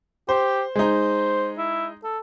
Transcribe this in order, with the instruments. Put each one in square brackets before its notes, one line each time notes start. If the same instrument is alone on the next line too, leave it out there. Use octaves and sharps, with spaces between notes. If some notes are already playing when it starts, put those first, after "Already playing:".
[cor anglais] G4 [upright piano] C5
[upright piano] G#3 D#4 [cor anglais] C5
[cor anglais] E4
A4